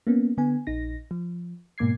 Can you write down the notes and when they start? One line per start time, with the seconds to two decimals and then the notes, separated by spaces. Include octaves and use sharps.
0.07 A#3 B3 C#4
0.38 D3 B3 G#5
0.67 A#1 D#4 A#6
1.11 F3
1.78 G#2 B2 A#3 D6 G#6 C7